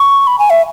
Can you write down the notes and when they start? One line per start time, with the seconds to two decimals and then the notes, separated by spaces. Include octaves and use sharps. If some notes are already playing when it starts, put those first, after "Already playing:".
Already playing: C#6
0.27 B5
0.39 G#5
0.50 E5